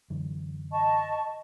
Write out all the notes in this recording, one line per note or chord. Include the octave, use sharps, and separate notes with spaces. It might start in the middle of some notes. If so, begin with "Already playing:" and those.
F#2 D3 E3
D#5 A5 C#6